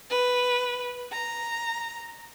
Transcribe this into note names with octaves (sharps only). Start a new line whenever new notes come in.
B4
A#5